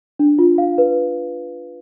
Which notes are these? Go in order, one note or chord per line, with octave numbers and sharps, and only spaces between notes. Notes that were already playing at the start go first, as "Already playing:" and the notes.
D4
F4
F5
B4